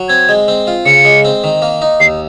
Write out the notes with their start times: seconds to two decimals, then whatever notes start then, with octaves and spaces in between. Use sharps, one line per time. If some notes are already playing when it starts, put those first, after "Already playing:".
Already playing: F#3
0.09 C4 G#6
0.29 G#3
0.48 C4
0.67 F4
0.86 C#3 C#7
1.05 G#3
1.25 C4
1.44 D#3
1.62 A#3
1.82 D#4
2.00 D#2 C7